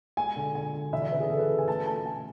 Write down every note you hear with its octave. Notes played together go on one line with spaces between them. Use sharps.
G#3 G#5
D3
D3 G#5
D3
E3 E5
D5
C#3 B4
G#4
C#3 A4
B4
C#3
G#5
A3 A5
A3 A5
A3 G#5